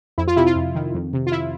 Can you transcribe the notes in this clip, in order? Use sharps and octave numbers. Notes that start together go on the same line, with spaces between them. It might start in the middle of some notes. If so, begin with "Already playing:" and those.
F2 E4
F4
C3 E4
F4
F2
D#3
F2
C3
F4
E4